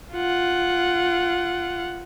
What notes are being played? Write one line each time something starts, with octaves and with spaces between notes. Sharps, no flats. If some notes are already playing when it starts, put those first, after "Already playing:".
F4 F#5